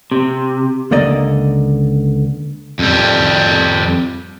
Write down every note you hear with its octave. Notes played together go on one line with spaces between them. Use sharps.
C3
C#2 D3 A#3 D5 D#5
F2 G3